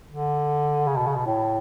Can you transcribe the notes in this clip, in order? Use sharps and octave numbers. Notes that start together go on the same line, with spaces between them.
D3
C#3
B2
C#3
B2
A2